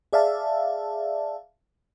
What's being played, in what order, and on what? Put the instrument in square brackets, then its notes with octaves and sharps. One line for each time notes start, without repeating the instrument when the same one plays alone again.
[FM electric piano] G#4 D5 E5 F5 A5